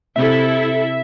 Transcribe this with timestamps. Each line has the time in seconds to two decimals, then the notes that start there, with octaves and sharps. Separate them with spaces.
0.16 C3 E4 A4 E5